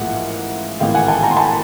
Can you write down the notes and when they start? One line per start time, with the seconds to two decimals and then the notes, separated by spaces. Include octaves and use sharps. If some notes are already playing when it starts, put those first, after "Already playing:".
Already playing: A1 G#2 F3 A#3 E5 F#5
0.80 A1 G#2 D#3 F5 G5
0.95 F#5 G#5
1.08 G5 A5
1.23 G#5 A#5
1.31 C6
1.36 A5 B5